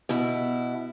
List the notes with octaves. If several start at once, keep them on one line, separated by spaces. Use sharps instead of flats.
B2 E4